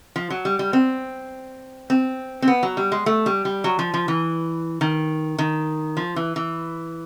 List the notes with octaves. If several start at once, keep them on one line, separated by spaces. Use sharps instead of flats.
F3
F#3
G3
G3
C4
C4
C4
B3
F#3
G3
G#3
A3
G3
G3
F#3
F3
F3
E3
D#3
D#3
F3
E3
E3